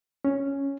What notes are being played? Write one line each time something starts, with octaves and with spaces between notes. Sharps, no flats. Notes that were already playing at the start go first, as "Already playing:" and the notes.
C#4